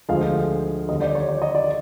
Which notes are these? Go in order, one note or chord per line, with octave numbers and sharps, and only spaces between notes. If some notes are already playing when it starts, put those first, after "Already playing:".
D2 D3 F3 G#3 F5
D#2 D3 G3 D#5
D5
C#5
D5
D#5
D5